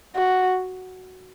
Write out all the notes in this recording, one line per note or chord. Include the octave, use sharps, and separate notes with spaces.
F#4